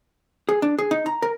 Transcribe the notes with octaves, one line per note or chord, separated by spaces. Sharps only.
G#4
D4
G#4
D#4
A#5
A#4